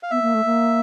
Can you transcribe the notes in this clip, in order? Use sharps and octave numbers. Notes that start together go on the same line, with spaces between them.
F5
B3 E5
A#3
A3
A#3